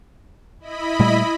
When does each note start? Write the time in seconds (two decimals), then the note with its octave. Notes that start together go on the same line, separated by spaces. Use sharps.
0.60 E4 D#5 B5
1.00 A#2 G3 A3